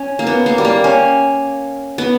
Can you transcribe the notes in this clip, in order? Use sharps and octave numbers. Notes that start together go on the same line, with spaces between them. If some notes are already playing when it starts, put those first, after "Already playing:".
Already playing: C#4
A#3
B3
A#3
G3
A#3
C#4
B3